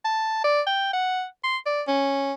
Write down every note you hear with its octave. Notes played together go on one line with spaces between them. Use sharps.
A5
D5
G5
F#5
C6
D5
C#4